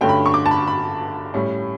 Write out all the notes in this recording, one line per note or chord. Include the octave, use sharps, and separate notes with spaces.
G2 D3 A3 C#4 G5
B5
C#6
D6
A5
B5
B5
A2 G3 C#4